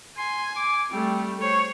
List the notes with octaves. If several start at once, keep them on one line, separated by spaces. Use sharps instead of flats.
G#5 C6
D6
G3 A3 C4
C5 C#5